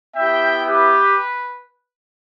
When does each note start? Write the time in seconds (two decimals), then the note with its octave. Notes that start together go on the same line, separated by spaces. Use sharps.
0.15 B3 E4 G4 E5 G5
0.67 G4 B4